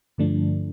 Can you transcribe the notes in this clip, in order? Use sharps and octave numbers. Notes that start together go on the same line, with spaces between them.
G2 D3 F3 A3 D4